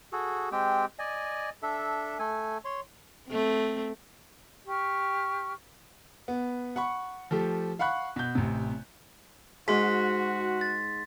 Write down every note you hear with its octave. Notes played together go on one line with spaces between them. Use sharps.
F#4 G#4 A4
G#3 C4 G4 G5
D5 D#5 G#5
D4 A4 E5
A3 A4 G#5
C#5 C6
A3 C4
G4 C#6 F6
B3
F#5 B5 C#6
F3 A3 G4 A4
F5 F#5 B5 C#6 F#6
B2 G6
A1 C3
G#2 F#4 C6 B6
A6